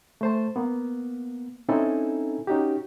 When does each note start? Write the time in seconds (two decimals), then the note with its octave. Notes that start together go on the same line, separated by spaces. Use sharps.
0.21 A3 C5 A5
0.56 A#3 B3
1.69 C4 C#4 D#4 E4 A4 G#5
2.47 C#4 D#4 F#4 G4